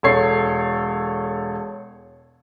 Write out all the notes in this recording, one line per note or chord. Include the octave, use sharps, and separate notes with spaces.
E1 A4 C#5 C7